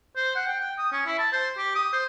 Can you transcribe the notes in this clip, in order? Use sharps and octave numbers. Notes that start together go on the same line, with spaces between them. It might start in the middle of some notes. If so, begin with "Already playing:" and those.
C5
F#5
G5
G5
D#6
C#4
E4
A5
C5
G4
D#6
C5